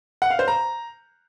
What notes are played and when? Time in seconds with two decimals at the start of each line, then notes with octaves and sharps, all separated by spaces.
0.22 F#5
0.30 F5
0.39 C5
0.48 A#5